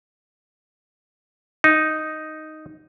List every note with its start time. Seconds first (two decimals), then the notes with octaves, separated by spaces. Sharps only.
1.64 D#4